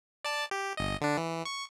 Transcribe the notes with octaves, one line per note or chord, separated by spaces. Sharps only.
D5 A5
G4
G1 D#5
D3 D4
E3
C#6